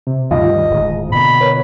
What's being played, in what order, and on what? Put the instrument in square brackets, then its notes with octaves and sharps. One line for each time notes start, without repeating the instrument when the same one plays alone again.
[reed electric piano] C3
[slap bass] D2 G2 G3 [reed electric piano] D#3 [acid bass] F4 [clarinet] D#5
[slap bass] D1 G#2
[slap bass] B2 D3 A#3 [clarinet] B5
[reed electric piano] A#4 B4 C#5